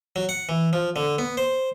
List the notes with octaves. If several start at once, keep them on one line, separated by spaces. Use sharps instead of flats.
F#3
F#5
E3
F3
D3
B3
C5